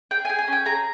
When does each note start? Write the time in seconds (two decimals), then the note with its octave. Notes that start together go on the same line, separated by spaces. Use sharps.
0.11 G#4 G5
0.25 G#5
0.29 G#4
0.39 G#5
0.48 C#4
0.53 G5
0.65 G#4 A#5